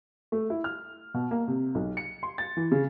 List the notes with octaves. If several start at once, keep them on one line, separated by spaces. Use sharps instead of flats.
A3
E4
F6
B2
A#3
C3
B1
C#7
C6
A6
E3
C#3